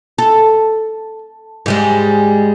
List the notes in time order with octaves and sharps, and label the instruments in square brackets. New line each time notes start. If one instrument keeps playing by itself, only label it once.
[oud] A4
G#2 G3 G#3